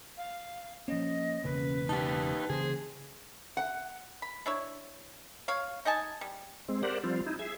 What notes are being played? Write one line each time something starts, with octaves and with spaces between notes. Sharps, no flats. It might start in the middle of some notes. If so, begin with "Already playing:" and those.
F5
F3 A#3 C#4 D#5
E1 C#3 A#3 B4
D#4 G4 A5
C#3 E3 A#3 G#4 C5
F#5
B5
D4 E4 C#5
C#5 F5
D#4 D#5 G#5 A5
G3
G#3 C4
G4 A#4 C5 D5 F#5
F3 G3 C4 F4
D#4 E4
G#4 E5